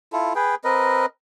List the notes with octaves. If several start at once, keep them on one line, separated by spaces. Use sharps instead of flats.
E4 F4 A4
G#4 B4 G5
C4 A#4 B4 D#5